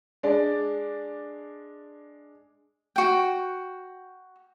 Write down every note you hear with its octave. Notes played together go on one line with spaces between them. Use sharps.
G#3 D4 D5
F#4 G5